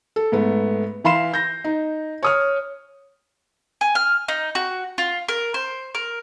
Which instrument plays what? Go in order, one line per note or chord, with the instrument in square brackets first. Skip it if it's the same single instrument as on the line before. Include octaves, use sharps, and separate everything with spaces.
[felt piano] A4
G#2 A3 B3
E3 F5 B5 C6 C7 E7
G6 A#6
D#4
C#5 D#6 F6
[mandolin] G#5
F6
D#4
F#4
F4
A#4
C5
A#4